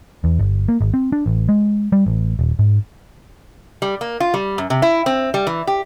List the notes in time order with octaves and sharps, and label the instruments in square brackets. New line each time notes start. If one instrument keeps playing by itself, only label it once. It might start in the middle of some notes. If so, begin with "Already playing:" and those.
[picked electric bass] E2
G1
A#3
G#1
C4
D4
A1
G#3
G3
A1
D#1
G#2
[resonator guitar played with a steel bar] G3
A#3
F4
G3
F#2
C3
E4
C4
G3
E3
G4